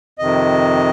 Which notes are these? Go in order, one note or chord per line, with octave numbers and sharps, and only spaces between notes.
F2 C3 D#3 D#5